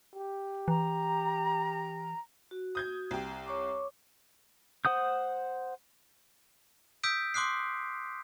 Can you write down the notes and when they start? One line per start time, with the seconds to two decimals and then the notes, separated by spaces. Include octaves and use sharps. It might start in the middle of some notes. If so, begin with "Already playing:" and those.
0.15 G4
0.68 E3 A#5
2.51 F#4
2.75 D#6 G6 G#6
3.11 C2 G5
3.46 C#5 C#6 D6
4.85 C5 F#5 D#6 G6
7.03 D#6 E6 G6 B6 D7
7.34 C6 D6 D#6 F#6 C7